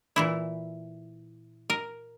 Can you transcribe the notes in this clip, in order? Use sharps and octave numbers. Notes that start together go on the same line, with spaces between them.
A#2 E3 E4
A#4